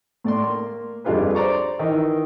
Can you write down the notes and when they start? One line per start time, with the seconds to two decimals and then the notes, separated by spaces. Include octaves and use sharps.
0.24 A2 D5 C6
0.43 A#3
1.04 F2 G3 D4 F4 G#4 B4
1.35 C5 D5 A#5 C#6
1.79 D#3 E3